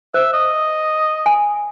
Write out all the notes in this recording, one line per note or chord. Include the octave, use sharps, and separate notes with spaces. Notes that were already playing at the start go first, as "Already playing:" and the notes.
C5 E5
D#5
G#5